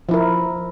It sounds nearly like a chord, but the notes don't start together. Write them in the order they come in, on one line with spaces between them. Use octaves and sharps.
F3 E4 A#4